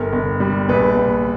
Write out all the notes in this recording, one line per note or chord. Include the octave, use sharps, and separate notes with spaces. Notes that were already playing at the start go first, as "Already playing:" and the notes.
Already playing: G1 A#4
G1
G3
A#1 B4
A#1